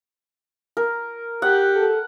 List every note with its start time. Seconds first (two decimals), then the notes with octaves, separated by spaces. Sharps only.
0.77 A#4
1.42 G4 F#5
1.76 A4